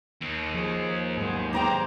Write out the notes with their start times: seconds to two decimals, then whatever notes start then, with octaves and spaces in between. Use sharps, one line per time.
0.21 D#2
0.54 F3 G#4
1.17 G#2 F#3 B3 G#4 C5
1.53 G#4 C5 G5 A#5 D6